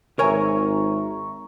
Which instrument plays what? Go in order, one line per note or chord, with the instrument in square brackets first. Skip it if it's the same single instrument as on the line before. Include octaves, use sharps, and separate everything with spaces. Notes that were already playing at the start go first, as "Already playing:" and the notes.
[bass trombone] G#1 [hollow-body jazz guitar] A#4 C#5 G#5 [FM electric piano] E5 A#5 C#6